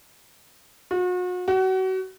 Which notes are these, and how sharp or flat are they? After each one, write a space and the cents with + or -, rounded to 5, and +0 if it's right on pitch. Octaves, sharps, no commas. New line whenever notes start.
F#4 -40
F#4 +30